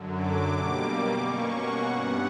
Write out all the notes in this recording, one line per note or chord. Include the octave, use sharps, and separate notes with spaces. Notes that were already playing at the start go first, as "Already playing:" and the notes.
Already playing: F#2 D3 F#3
D6
B2 G3 A#3 D6
D6
B2 A#3 C#4 C#6
F#5
G2 E3 G3 B3 F#5